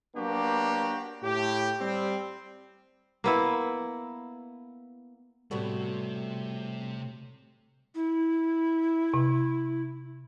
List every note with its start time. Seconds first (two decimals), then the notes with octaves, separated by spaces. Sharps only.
0.16 F#3 A#3 B3 D4 F#4 G4
1.23 A2 G4
1.80 G3 C4
3.24 A#3 B3 E4
5.51 A2 C3 G3 B3 F#4 A4
7.95 E4
9.14 C3